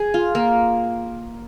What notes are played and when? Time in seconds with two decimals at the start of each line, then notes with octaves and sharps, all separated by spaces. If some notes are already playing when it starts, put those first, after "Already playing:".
Already playing: G#4
0.14 F4
0.35 A#3